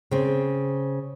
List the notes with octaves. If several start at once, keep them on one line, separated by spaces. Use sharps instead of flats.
C#3 C4